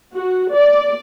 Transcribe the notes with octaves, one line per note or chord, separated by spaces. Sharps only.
F#4
D5